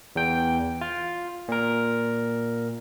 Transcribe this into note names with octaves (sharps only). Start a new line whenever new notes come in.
E2 G5
F4
A#2 A#4